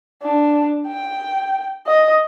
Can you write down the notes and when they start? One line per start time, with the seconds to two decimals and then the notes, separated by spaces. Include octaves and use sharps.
0.23 D4
0.87 G5
1.87 D#5